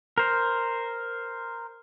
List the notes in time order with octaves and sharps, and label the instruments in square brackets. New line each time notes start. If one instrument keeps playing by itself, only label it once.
[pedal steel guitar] A#4 C5